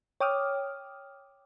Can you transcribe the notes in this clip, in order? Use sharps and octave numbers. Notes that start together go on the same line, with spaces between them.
C#5 G5 D6 D#6 F6